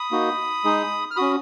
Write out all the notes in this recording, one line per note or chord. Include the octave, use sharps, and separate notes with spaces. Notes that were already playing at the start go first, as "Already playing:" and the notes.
Already playing: B5 D#6
A#3 D#4 F#4
G#3 D#4 G#4
F6
C#4 F#4 B5 D#6